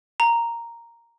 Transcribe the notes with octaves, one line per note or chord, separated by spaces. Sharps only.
A#5